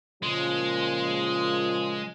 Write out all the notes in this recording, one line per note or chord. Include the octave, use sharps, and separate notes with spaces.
A#2 C#3 F3 G#3